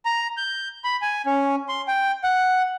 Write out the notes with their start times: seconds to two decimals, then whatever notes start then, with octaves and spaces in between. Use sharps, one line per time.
0.05 A#5
0.37 G6
0.84 B5
1.02 G#5
1.26 C#4
1.68 C6
1.88 G5
2.24 F#5